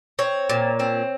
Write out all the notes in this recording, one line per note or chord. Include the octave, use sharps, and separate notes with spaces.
C4 C#5
A#2
C4